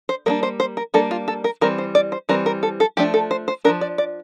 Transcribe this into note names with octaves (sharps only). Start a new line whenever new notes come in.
C5
G3 A#3 D4 A#4
C5
C5
A#4
G3 A#3 D4 A4
F4
A4
A#4
E3 G3 C4 A#4
C5
D5
C5
E3 G3 C4 A#4
A#4
A4
A4
F3 A3 D4 G4
A4
C5
C5
F3 A3 D4 A#4
D5
D5